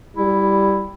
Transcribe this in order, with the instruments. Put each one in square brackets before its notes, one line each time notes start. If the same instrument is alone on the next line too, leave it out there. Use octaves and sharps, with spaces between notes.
[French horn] G3 [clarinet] E4